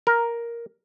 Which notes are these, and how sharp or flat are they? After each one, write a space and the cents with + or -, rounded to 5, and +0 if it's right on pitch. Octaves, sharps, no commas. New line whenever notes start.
A#4 +5